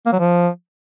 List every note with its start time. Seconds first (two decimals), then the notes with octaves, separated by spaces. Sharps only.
0.06 A#3
0.13 F#3
0.19 F3